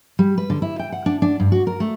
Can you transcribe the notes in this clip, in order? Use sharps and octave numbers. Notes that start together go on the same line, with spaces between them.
G3
B4
D3
E4
G5
F#5
D4
D4
G2
F#4
A#4
A3